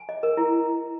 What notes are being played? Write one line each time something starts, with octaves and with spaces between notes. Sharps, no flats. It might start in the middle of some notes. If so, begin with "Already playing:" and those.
Already playing: G#5
D#5
A#4
E4